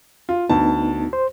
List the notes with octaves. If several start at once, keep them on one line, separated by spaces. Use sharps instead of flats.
F4
D2 B3 D#4 A5
C5